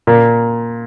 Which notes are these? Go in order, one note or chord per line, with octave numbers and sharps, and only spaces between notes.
A#2